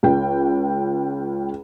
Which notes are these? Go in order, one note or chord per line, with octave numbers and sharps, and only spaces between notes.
C#2 G5